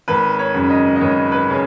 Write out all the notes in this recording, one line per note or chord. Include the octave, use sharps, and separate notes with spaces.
G#1 B4
C#5
F#2 C#3
D#5
D#5
G#1 C#5
B4
C#3